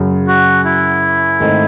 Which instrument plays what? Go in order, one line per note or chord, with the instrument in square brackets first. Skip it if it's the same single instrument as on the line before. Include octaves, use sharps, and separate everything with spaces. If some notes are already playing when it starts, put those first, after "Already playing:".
Already playing: [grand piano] F#2 C#3 F#3
[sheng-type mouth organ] F#4
E4
[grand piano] G#2 D#3 A3 C4 D#4